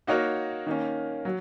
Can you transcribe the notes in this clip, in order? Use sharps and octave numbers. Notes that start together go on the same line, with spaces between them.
A#3 D#4 F#4 A#4 C#5
D#3 A#3 C#4
F#3